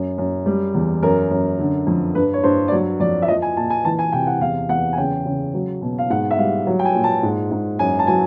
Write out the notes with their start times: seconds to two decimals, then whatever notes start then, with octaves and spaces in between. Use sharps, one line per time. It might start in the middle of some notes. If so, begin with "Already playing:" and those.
Already playing: F#2
0.18 F#2
0.46 G3
0.75 E2
1.03 F#2 A#4
1.31 F#2
1.59 D3
1.87 F2
2.15 G2 B4
2.33 C#5
2.44 G2 C5
2.68 D5
2.71 F#3 C#5
3.00 F2 D5
3.22 E5
3.28 F3 D#5
3.42 G#5
3.56 A#2 A5
3.70 G#5
3.85 E3 A5
3.99 G#5
4.12 C3 G5
4.27 F#5
4.41 E2 F5
4.69 E2 F#5
4.93 G#5
4.97 C#3 G5
5.26 C#3
5.54 F#3
5.82 B2
5.99 F5
6.10 G#2 F#5
6.31 E5
6.38 G3 F5
6.67 F#3
6.79 G5
6.85 G#5
6.95 A#2
7.04 A5
7.23 G#2
7.51 G#2
7.79 F#2 G#5
7.99 A5
8.07 F#3 G#5